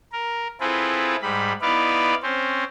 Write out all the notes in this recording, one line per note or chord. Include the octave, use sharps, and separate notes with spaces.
A#4
C4 E4 F4 G#4 A4 B4
G#2 G3 B5
B3 D#4 E4 B4 D5 F5
C4 C#4 C5